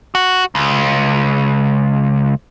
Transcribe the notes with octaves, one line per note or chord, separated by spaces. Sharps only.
F#4
C#2